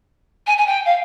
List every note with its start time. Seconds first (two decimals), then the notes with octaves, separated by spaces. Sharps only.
0.47 G#5
0.58 G#5
0.67 G5
0.85 F5